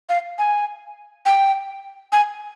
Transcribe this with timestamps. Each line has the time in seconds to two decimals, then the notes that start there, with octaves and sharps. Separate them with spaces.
0.09 F5
0.38 G#5
1.26 G5
2.12 G#5